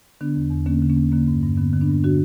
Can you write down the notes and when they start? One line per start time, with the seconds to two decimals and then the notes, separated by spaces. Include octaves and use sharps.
0.21 D3 B3 D4
0.36 E2
0.51 E2
0.66 D3 A#3 C#4
0.82 D3
0.90 A#3 C#4
0.97 E2
1.12 D3 A#3
1.28 G2
1.43 G2
1.58 D3 B3
1.73 D3
1.81 B3 D4
1.89 G2
2.04 D3 D4 F#4